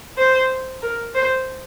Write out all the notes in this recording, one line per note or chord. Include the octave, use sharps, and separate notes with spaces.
C5
A#4
C5